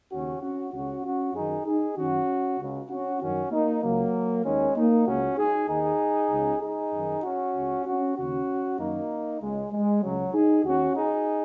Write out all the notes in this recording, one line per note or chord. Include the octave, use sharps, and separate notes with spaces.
D#2 C#3 C#4 F#4
C#4 F#4
C#2 C#3 C#4 F#4
C#4 F#4
F#2 D#3 D#4 G#4
D#4 G#4
F#2 D#3 C#4 F#4
C#2 C#3
C#4 F#4
F#2 D#3 C#4 F#4
A#3 D#4
C#2 C#3 F#3 A#3
D#2 D#3 G#3 C#4
A#3 D#4
C#2 C#3 C#4 F#4
D#4 G#4
D#2 D#3 D#4 G#4
C#2 C#3
D#4 G#4
F#2 D#3
C#4 F#4
C#2 C#3
C#4 F#4
D#2 C#3 C#4 F#4
F#2 D#3 A#3 D#4
C#2 C#3 G#3
G#3
C#2 C#3 F#3
D#4 G#4
D#2 D#3 C#4 F#4
D#4 G#4